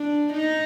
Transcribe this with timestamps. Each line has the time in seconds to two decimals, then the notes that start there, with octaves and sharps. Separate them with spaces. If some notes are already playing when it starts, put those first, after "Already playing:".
Already playing: D4
0.33 D#4